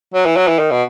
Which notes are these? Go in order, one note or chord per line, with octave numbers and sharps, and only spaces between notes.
F#3
E3
F#3
E3
D#3
B2